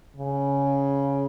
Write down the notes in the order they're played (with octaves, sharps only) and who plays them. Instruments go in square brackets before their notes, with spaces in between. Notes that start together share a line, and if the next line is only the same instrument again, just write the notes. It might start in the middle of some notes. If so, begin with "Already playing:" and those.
[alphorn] C#3